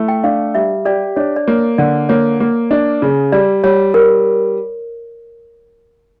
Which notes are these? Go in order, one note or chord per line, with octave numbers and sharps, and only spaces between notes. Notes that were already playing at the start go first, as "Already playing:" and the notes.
Already playing: A3 E4
G5
D4 F5
G3 E5
G4 D5
D4 C#5
D5
A#3 C#5
D3 D5
A#3 C#5
A#3
D4
C#3
G3 D5
G3 C#5
G3 A#4